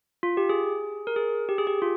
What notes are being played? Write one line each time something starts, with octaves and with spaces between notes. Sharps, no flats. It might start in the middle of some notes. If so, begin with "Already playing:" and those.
F4
G4
G#4
A#4
G#4
G4
G#4
G4
F4